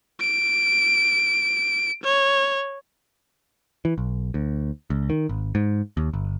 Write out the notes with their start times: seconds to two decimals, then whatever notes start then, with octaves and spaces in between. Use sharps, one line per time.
0.21 D7
2.03 C#5
3.85 E3
3.98 B1
4.34 D2
4.90 C#2
5.10 D#3
5.29 G#1
5.55 G#2
5.97 D#2
6.14 G1